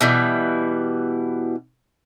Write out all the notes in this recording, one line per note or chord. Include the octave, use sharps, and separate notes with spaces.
B2 E3 G3